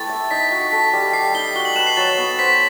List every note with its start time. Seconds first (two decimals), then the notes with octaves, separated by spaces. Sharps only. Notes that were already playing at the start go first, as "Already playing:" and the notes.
Already playing: A3 E4 G4 B4 A6
0.09 E5
0.31 D#4 B6
0.52 F#4
0.72 A4 B6
0.93 G3
1.13 G3 C7
1.34 D#4 G7
1.55 F#4 G7
1.65 F#7
1.76 B4 E7
1.87 C7
1.97 F#3 A6
2.17 B3
2.38 C5 B6